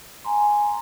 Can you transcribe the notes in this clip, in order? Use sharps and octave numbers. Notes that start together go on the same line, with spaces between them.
G#5 A#5 C6